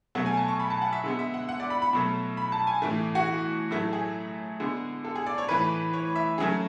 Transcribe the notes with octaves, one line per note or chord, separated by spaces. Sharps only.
B2 F#3 A3 F#5
G#5
A5
C#6
B5
A5
F#5
E5
D3 G#3 B3
E5
F#5
F#5
D5
B5
B5
B2 F#3 A3
B5
A5
G#5
A2 E3 A3
F#4
A2 F#3 A3 E4
G#4
D3 G#3 B3
A4
G#4
D5
C#5
A2 E3 A3 B4
C#5
E5
C#3 F#3 A3 G#4